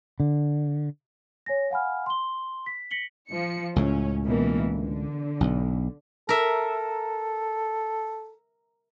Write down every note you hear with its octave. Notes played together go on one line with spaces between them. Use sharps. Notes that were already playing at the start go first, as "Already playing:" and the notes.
D3
C#5 G#5 A#6
F5 F#5 G#5 B5 F6
C6 G7
B6
A#6 B6 C#7 F#7 G7
F3 C#7
C#2 A2 C#4
B2 E3 A#3
D3
B1
A4 A#4 E5